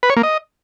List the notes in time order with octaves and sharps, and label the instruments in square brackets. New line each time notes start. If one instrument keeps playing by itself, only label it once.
[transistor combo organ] B4
C#5
A#3
D#5